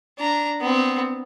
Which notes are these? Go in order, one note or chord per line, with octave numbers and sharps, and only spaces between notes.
D4 A#5
B3 C4